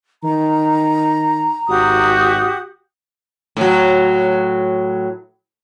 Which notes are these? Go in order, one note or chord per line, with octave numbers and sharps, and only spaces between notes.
D#3 A#5
G#1 F#4 G4 D#6
A2 F#3